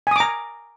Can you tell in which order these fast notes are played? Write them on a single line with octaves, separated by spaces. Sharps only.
G#5 D#6 D6 A#5